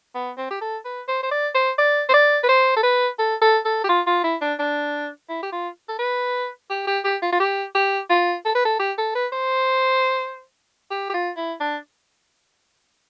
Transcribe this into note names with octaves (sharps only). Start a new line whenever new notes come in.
B3
C4
G4
A4
B4
C5
C5
D5
C5
D5
C5
D5
B4
C5
A4
B4
A4
A4
A4
G4
F4
F4
E4
D4
D4
E4
G4
F4
A4
B4
G4
G4
G4
F4
F4
G4
G4
F4
A4
B4
A4
G4
A4
B4
C5
G4
G4
F4
E4
D4